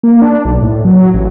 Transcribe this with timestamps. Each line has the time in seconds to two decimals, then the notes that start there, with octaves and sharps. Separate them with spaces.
0.03 A#3
0.22 D4
0.45 B1
0.62 A2
0.85 F#3
1.14 A1